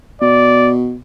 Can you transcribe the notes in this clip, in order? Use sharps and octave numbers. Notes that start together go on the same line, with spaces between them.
B2 D5